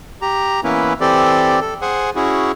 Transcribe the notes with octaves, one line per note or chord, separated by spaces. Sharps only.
G4 A#5
E3 A#3 B3 C#4 E4 B4
E3 C4 G4 A4 D5
A4
G#4 C5 F#5 G#5
C#4 E4 F#4 G#4